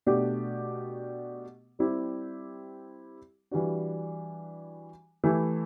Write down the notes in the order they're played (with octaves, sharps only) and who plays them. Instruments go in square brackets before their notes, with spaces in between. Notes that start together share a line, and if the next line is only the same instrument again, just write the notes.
[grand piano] B2 A3 D4 G4
G3 C4 E4 G4
E3 G3 D4 F#4
E3 A3 E4 G4